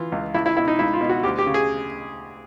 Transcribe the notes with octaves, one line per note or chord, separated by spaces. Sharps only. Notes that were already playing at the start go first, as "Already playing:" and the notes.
Already playing: E3 F4
C#2
C#2 E4
E4
B2 E4
D#4
C#2 E4
F4
B2
F#4
D2 G4
G4
C#3
G#4